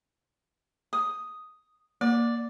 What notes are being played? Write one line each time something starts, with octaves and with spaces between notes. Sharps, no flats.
D#6
A#3 D5